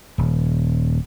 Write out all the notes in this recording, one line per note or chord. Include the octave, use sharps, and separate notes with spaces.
D#1